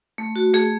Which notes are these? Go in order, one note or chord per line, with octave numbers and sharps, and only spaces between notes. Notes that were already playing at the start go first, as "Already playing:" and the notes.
A3
F#4
A3 G#4